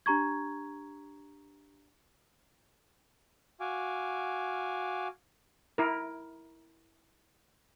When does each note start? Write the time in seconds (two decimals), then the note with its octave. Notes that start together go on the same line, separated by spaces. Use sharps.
0.06 D4 G4 A#5 C#6 G#6
3.61 F#4 F5 G#5 D6
5.78 E4 A#4